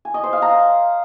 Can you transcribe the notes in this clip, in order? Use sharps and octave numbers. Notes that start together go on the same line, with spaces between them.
G#5
D#5
C5
F5
A#5